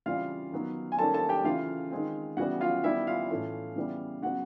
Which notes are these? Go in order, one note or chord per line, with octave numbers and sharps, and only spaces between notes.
C#3 E3 G3 C4 F4 F5
D#3 F#3 B3
G#5
D#3 G3 A#3 C#4 A4 A5
A4 A5
G4 G5
C#3 E3 A3 F4 F5
D#3 G#3 C4
C#3 E3 G3 B3 F#4 F#5
F4 F5
D#3 G3 B3 E4 E5
F4 F5
A2 E3 A3 C#4
C#3 E3 G3 B3
C#3 F#3 B3 F#4 F#5